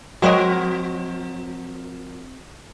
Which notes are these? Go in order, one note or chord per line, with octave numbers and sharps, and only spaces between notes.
F3 F#3 G#3 C4 F#4 A#4 C#5 D#5